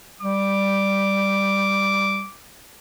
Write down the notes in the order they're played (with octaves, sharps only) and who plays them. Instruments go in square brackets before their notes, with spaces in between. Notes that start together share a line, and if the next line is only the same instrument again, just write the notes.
[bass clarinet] G3 [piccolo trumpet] D6